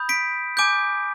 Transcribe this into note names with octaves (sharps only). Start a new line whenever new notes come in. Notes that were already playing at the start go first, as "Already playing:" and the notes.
Already playing: B5 D#6 G6
B6 D7
G#5 D6 G6